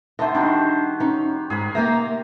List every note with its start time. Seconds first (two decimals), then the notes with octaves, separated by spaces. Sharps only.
0.19 D3 D#3 C5 D#5 E5
0.34 D#3 G3 D4 F#4
1.00 C#4 D#4
1.50 G#2 G#4 A#4 B5
1.75 C3 A#3 A#4 E5 G5 A#5